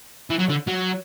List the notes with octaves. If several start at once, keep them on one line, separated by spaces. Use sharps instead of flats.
E3
F#3
D3
F#3